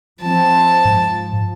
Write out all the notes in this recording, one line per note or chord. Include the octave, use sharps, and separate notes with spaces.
F3 C4 A5
G#2 F3